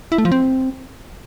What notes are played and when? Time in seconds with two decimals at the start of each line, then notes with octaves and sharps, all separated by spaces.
0.12 E4
0.18 A3
0.25 F3
0.32 C4